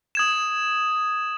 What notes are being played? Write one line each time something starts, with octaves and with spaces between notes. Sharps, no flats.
D#6 G#6 E7